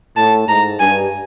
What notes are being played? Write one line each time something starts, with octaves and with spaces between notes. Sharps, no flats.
A2 A5
G#2 A#5
G2 G#5